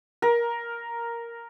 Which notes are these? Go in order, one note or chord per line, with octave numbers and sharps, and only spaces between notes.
A#4